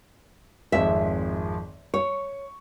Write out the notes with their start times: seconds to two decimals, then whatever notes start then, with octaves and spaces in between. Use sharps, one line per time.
0.72 G#1 F2 G#3 E5
1.94 C#5 C#6